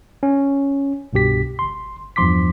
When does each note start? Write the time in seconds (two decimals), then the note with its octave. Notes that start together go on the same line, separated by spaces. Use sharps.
0.23 C#4
1.13 C2 G2 B2 G4 B6
1.59 G1 C6
2.16 E2 G2 F3 C6 D6 B6